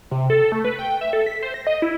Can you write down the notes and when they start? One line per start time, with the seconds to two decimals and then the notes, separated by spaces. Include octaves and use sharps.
0.11 C3
0.30 A4
0.52 A3
0.65 B4
0.79 G5
1.01 E5
1.13 A4
1.26 B6
1.42 C5
1.54 A#6
1.67 D#5
1.82 E4